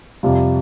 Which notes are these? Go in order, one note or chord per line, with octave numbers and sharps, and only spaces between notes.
F2 C3 G3 F4